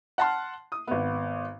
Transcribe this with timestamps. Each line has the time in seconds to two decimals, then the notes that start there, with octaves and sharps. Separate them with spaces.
0.18 F#5 A5 C6 F6
0.72 D#6
0.87 G#1 B3